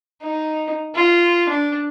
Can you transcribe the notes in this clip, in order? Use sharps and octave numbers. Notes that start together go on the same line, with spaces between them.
D#4
F4
D4